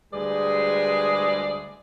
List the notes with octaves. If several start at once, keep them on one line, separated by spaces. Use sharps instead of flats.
D2 G3 G#3 G#4 B4 D5